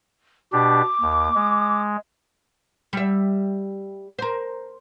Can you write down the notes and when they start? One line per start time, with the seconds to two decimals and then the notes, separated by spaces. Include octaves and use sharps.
0.53 B2 D4 G4 D6
1.01 D#2
1.35 G#3
2.93 G3 E5
4.19 A#4 C5